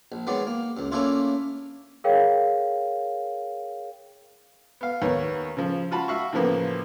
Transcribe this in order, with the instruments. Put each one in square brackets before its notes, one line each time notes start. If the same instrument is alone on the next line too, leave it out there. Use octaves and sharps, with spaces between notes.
[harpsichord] A#1
D#3 F#3 G#3 B3 D5
A#3
C#2 F#2
A3 A#3 C#4 D4 E4 F4
[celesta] G#4 A#4 C#5 F5 G5
[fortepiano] B3 F5
D#2 B3 A#4 C#5
C#3 F3
F4 F#4 A5 B5
F#4 E5 F5 C#6
A2 C#3 E3 F3 A#3 B3